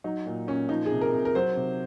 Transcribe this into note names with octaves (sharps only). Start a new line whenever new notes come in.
F#3 D#4
A#2
A#2 C#4
F3 D#4
G#4
C3
A#4
C3
A#4
F#3 C5
C3